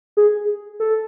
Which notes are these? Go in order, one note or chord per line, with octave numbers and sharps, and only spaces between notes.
G#4
A4